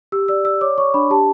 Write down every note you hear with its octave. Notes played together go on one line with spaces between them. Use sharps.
G4 E6
D5 E6
D5 E6
C#5 D6
C#5 C#6
D4 B5
G4 A5